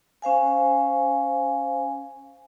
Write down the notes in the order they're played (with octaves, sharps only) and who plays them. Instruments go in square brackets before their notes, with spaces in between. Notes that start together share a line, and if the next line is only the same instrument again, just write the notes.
[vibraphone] C#4 C5 F5 G#5